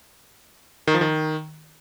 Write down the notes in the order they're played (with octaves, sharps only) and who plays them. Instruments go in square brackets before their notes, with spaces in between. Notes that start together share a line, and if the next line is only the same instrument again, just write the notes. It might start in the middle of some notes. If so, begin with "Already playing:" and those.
[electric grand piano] D#3
F3
D#3